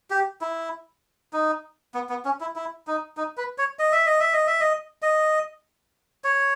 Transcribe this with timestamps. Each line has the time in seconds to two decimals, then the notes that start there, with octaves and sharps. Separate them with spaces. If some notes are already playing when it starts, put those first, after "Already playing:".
0.10 G4
0.41 E4
1.33 D#4
1.94 B3
2.09 B3
2.25 C#4
2.41 E4
2.56 E4
2.87 D#4
3.17 D#4
3.37 B4
3.58 C#5
3.79 D#5
3.92 E5
4.06 D#5
4.20 E5
4.33 D#5
4.47 E5
4.60 D#5
5.02 D#5
6.24 C#5